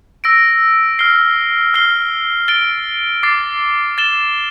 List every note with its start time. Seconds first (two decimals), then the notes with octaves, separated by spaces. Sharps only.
0.24 E6 A#6 D7
0.99 F6 C7 G7
1.74 F6 C7 G7
2.48 A6 D7 G7
3.23 D6 A6 C7
3.98 A6 E7 G7